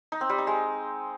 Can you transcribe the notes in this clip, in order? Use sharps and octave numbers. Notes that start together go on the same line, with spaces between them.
D#4
C4
G3
D#4
G#3